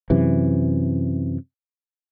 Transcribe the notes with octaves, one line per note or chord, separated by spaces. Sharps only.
F#2 C3 E3